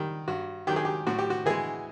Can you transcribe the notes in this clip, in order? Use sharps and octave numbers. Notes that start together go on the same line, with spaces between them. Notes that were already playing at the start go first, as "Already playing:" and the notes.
Already playing: D#3 G3
G2 F#4
D#3 F#3 G4
G#4
G4
A2 F#4
G4
F#4
E3 G#3 G#4